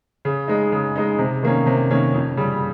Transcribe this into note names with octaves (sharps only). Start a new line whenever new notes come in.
C#3
G#3 D#4
C#3
G#3 D#4
C3
D#3 A#3 C#4
C3
D#3 A#3 C#4
F2
C#3 G3